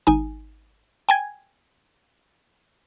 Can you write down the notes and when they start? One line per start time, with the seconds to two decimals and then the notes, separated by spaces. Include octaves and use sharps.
0.07 G#1 D#4 G#5
1.09 G5 G#5 G#6